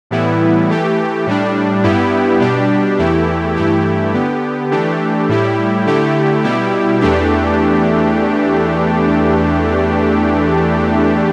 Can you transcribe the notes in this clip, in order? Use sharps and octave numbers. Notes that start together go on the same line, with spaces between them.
A2 E3 G3 B3 E4
E3 A3 G4
A2 G3 D4
G2 G3 B3 E4 G4
B2 G3 D4 G4
E2 E3 A3 E4 G4
G2 E3 A3 E4 G4
D3 B3 G4
E3 A3 D4 G4
A2 G3 E4 G4
D3 A3 E4 G4
B2 G3 E4 G4
E2 E3 A3 D4 G4